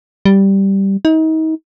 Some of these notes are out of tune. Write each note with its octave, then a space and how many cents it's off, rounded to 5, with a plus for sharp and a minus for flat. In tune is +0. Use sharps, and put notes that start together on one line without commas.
G3 -5
D#4 +35